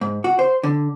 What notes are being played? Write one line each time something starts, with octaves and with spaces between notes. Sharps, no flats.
G#2
F#4
C5
D3